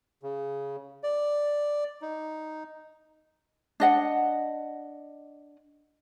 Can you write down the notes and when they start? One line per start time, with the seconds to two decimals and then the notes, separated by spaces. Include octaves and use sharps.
0.23 C#3
1.03 D5
2.02 D#4
3.80 D4 D#5 F#5